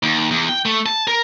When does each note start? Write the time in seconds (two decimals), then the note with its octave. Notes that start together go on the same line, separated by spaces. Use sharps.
0.03 D#2
0.31 E2
0.49 G5
0.66 A3
0.86 A5
1.08 A#4